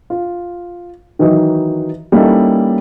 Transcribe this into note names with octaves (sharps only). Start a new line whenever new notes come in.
F4
D#3 E3 F#3 D#4
G3 A#3 C#4 D#4 E4 A4